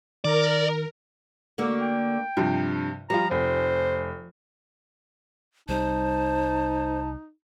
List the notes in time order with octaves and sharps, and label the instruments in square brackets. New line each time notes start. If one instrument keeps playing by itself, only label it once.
[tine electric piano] D#3 [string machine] A#4 [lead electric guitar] D5
[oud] D3 A#3 F#4
[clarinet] G5
[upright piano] G2 C3 F3 [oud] F4
[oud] F3 [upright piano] G3 F4 [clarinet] A#5
[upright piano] F1 [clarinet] C5
[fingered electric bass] C2 G3 [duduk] D#4 [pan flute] C5 [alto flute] A5